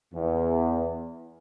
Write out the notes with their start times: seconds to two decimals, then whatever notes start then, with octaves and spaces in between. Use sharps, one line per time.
0.13 E2